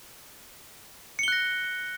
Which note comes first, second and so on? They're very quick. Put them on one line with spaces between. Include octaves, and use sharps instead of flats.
C#7 G7 F#6 A#6